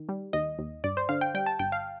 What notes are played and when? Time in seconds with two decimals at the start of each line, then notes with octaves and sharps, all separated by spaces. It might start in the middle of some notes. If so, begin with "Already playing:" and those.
Already playing: D#3
0.09 G3
0.33 D#2 D#5
0.59 D#2
0.84 G2 D5
0.97 C5
1.09 D3 F5
1.21 G5
1.34 G3 G5
1.46 A5
1.59 G1 G5
1.72 F5